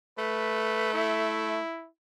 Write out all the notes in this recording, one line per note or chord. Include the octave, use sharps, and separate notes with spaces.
A3 B4
E4